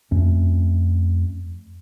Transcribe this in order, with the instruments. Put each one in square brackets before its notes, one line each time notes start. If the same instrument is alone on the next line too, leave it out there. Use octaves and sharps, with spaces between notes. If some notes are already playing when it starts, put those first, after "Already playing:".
[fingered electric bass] F2 A3 C#4